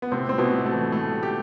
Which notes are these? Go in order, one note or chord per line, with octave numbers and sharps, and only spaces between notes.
B3
A2 C3 C4
G3 C4
B2 B3
A2
A3
E3
A2 A3
G3
G4